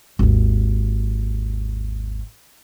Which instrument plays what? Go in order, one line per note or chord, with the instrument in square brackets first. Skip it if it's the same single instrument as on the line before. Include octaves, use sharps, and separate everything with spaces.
[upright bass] G#1 D#2